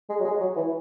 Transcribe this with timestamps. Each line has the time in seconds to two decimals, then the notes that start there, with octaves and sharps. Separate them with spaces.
0.09 G#3
0.19 F#3
0.25 G#3
0.40 F#3
0.56 E3